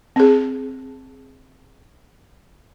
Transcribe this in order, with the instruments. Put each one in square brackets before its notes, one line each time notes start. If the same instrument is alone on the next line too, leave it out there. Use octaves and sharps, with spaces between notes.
[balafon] C4 G#4